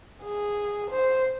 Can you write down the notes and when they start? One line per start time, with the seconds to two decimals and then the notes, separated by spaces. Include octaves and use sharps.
0.23 G#4
0.90 C5